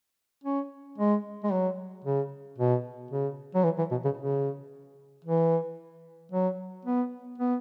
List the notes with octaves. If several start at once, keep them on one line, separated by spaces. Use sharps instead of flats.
C#4
G#3
G#3
F#3
C#3
B2
C#3
F#3
E3
E3
B2
C#3
C#3
E3
F#3
B3
B3